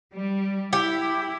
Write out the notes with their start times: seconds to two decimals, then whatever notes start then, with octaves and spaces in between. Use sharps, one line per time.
0.13 G3
0.73 E4 G4